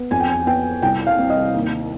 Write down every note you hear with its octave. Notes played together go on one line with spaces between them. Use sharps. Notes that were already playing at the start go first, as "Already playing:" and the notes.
Already playing: B3
F2 G#5
G5
G#5
B3 G5
C2 G5
F5
C4
D#5
D#2